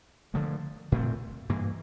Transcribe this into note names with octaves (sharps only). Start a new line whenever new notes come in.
D3 F3 A3
A#2 A3 C4
G2 E3 A#3